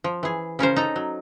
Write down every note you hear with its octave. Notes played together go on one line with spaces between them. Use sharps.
F3
E3 G#4
C#3 C#4 A#4 C5
D#4 A4 A#5
F#3